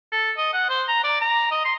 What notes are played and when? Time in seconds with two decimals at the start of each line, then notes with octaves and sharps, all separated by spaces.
0.12 A4
0.38 D#5
0.54 F#5
0.70 C5
0.88 A#5
1.04 D5
1.21 A#5
1.52 D#5
1.65 C6